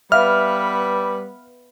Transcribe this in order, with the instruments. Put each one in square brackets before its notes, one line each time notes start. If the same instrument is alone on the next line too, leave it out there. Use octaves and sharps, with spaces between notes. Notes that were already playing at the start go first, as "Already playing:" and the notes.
[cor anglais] G3 [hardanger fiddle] B3 B4 [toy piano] E5 F5 [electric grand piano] F6